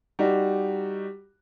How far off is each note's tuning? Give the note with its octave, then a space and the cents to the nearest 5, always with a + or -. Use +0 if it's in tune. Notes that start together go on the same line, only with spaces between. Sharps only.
G3 +0 D#4 +0 F#4 +0